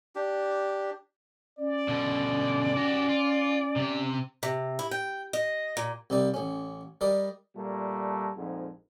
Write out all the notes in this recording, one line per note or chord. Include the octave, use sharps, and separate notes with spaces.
D4 G4
C#4 D5
B2 D3
F#4 G4
F4
C3 G4
C3
E4
G5
D#5
A#2
C2 C3 D#4 D5
A1 C#4
G3 A#4 D5 D#5
A#2 G3 A3 A#3
A#1 F2 G#2